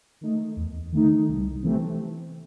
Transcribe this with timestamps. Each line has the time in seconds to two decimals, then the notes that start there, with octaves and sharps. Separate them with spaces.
0.21 D#3 A3 D#4
0.57 E2
0.92 D#3 A3 D#4
1.28 C2
1.63 C3 E3 A3 C4